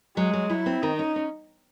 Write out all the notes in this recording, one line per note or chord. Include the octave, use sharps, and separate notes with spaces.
F#3 G#3
F#3
F#3 E4
C4
D#3 D#4
C#4
C#4